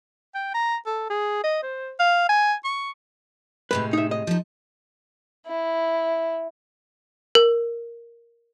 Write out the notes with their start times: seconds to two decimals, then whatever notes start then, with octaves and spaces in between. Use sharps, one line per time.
0.35 G5
0.54 A#5
0.86 A4
1.10 G#4
1.44 D#5
1.63 C5
2.00 F5
2.29 G#5
2.65 C#6
3.71 A2 C3 G#3 B4
3.93 D#4 E5
4.11 D#5
4.27 F3 D#4
5.46 E4
7.35 A#4